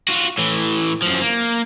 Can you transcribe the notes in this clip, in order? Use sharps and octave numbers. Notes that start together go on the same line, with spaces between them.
F4 F#4
A2 E3
F#2 F3
A#3